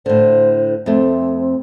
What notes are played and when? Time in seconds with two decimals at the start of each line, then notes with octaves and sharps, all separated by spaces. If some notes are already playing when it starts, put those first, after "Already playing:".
0.06 A2 D3 C5
0.86 F2 A3 C4